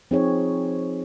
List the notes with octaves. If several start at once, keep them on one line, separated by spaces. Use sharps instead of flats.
F3 C4 D#4 G#4 C#5